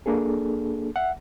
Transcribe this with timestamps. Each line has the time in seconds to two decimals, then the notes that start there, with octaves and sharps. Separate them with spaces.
0.06 A#3 D4 G#4 A4
0.96 E5 F#5